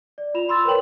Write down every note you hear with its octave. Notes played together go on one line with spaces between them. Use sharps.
D5
F4 B5 E7 F7
B5 C6 E6 A6
A#4 B4 C#5 G5 F#7